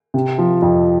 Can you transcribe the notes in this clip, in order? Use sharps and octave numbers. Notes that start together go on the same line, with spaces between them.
C3
F3
F2